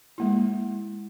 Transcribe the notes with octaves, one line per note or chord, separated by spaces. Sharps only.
G#3 A#3 E4